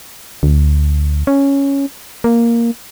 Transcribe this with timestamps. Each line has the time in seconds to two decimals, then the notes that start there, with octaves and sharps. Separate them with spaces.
0.43 D2
1.27 C#4
2.24 A#3